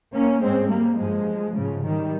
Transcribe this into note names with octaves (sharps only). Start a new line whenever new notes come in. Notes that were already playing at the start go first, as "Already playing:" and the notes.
A#3 C#4
G#2 G#3 C4
G3 A#3
G2 F3 G#3
G#2 C#3 F3
D#3 G3